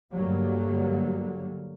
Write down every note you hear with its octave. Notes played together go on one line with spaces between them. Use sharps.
D2 G2 D3 F#3 G3 A#3